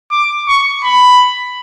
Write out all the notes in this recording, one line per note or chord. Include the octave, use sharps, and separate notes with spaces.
D6
C#6
B5